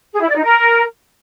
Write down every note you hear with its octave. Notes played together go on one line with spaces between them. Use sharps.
G#4
E4
D5
D#4
A#4